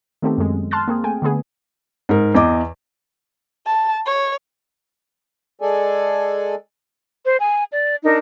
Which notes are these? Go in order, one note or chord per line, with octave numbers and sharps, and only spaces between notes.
D#3 A3 B3 C4 G4 A4
F#2 G#3
A5 C6 F6 F#6 A6
A#3 C4 G#4
A3 G5 G#5
D3 A3 B3 G#4
G#2 A#4
E2 E3 D#5 D6
A5
C#5
G#3 G#4 A4 D5 G#5
C5
G#5
D5
D4 D#4 A#4